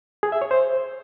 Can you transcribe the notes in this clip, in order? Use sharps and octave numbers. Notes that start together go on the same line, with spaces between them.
G#4
E5
C#5
C5